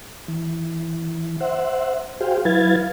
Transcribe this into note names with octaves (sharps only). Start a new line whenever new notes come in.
E3
C5 E5 F#5
F#4 G#4 C5 F5 G5
F#3 E4 B4 F5 G#6 A6